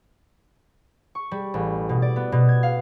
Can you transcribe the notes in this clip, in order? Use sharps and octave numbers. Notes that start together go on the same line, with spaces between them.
C#6
G3
A1
B2
D5
B3
B2
G#6
F5